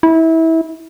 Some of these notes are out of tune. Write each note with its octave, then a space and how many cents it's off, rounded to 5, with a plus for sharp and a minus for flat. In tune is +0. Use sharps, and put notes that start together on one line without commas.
E4 -25